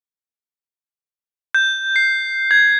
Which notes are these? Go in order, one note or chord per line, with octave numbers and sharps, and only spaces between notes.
G6
C7
G#6